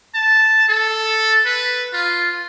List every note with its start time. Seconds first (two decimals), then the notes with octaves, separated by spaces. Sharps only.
0.15 A5
0.69 A4
1.45 B4
1.93 F4